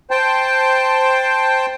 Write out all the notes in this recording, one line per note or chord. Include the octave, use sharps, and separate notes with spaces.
C5 G5 A5